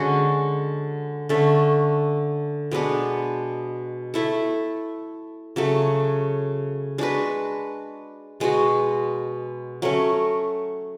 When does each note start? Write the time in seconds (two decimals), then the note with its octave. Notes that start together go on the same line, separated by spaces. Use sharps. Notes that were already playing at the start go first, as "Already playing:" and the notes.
Already playing: D3 G#3 C#4 F#4
1.29 D3 A3 C#4
2.71 B2 G#3 B3 D4
4.14 A3 E4 A4
5.56 C#3 F#3 A3
6.98 G#3 D4 F#4 B4
8.40 B2 G#3 B3 F#4
9.82 F#3 A3 C#4